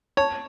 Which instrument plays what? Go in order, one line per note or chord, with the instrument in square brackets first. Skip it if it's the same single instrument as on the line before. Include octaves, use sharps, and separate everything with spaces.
[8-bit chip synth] C#5 [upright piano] A5 C#6